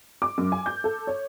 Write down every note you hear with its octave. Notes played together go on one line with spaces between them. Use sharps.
D6
F#2
G#5
G6
A4
C#5